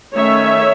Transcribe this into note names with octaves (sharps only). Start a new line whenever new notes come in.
D#3 A3 C#4 C#5 E5